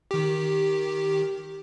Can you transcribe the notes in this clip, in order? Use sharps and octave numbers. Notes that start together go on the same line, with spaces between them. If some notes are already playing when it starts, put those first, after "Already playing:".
D#3 G4